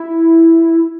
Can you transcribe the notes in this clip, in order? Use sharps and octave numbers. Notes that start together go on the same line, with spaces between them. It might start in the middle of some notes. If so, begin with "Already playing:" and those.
Already playing: E4